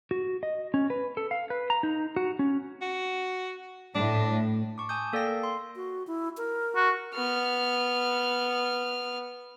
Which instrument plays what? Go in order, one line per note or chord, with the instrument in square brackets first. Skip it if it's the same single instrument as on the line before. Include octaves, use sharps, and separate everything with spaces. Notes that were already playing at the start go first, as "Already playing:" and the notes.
[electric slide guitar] F#4
D#5
C#4
B4
A4
F5
B4
A#5
D#4
F#4
C#4
[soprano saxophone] F#4
[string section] A2 [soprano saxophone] D4
[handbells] A5 C#6 D6
G#5 A5 D#6 G6
A#3 A4 D5 F5 G5 A#6
A#4
C6
[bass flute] F#4
E4
A#4
[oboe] F#4
[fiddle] B3 F6